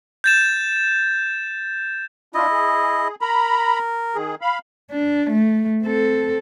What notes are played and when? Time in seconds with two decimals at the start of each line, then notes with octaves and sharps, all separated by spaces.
0.24 G6 A6 E7
2.34 D4 E4 F4 D#5
2.51 G#4
3.21 A#4 A#5 B5
4.15 D#3 G#4
4.41 F5 B5
4.91 D4
5.30 A3
5.83 C4 A4